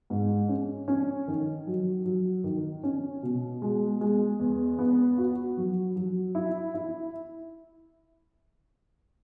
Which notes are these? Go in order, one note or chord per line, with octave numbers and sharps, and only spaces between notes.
G#2
C#4
C#4
D#3
F#3
F#3
D#3
C#4
B2
G#3
G#3
E2
B3
F#4
F#3
F#3
E4
E4